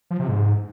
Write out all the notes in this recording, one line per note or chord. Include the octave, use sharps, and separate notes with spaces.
F3
C3
G#2